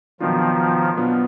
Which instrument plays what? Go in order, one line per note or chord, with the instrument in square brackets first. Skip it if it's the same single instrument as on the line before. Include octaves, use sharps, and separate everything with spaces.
[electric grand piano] B2 F#3 B3 D4 F4 [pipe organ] D#3 F3
[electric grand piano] B2 F#3 B3 D4 F4